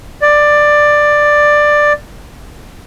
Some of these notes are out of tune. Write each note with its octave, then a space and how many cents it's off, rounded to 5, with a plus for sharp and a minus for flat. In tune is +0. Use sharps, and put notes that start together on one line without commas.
D5 +10